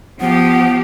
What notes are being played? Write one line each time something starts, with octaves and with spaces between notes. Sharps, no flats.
F3 B3 G4 F#5